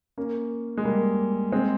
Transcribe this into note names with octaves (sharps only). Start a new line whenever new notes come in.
A#3 C#4
G#3
G3 A#3
G#3 C4